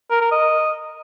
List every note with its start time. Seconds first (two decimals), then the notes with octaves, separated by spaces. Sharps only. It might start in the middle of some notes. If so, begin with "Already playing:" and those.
0.10 A#4
0.21 A#4
0.31 D#5